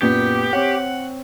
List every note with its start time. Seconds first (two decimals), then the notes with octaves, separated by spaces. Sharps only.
0.02 F#2 A#2 B3 G4
0.53 C4 C#5 F#5